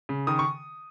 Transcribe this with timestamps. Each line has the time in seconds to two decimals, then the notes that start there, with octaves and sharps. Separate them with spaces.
0.09 C#3
0.27 D#3 D#6
0.39 C#6